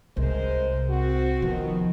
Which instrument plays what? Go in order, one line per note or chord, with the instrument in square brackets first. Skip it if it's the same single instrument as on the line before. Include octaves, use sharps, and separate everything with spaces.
[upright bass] C2 [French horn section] G#3 A#4 C5
[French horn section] C4 F#4
[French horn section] B2 D#3 [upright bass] F3